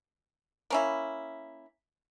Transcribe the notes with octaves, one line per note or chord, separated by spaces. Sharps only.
A#3 C#4 E4